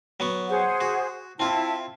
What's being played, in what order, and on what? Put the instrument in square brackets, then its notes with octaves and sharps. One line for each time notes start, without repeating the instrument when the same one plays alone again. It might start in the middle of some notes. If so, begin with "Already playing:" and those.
[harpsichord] F#3 B3 C#6
[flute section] G#4 C5 F#5
[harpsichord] F#4
[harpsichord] C4 F4 [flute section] E4 A5